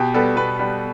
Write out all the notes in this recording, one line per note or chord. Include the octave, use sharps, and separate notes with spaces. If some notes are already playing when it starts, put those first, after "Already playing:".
Already playing: B2 G4
G3 B3 A4
B2 B4
G3 B3